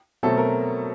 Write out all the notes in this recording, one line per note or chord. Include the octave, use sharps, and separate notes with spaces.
B2 F#3 A3 C4 A4
A#4